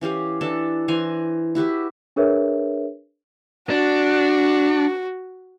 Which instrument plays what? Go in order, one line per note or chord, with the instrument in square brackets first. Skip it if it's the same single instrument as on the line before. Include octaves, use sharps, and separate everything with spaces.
[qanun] E3 C#4 G4 F5
E3 D4 A4 A5
E3 C5 G#5 A#5
E4 F#4 G4 B4
[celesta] D4 G#4 A#4 B4 C#5 E5
[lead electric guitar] D4 [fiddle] F#4